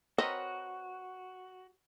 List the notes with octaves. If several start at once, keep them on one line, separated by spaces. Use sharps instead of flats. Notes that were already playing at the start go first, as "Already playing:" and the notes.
C4 F#4 A#4 B4 C#5 D#5